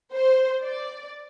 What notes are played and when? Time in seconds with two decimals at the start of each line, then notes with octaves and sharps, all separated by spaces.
0.12 C5
0.63 D5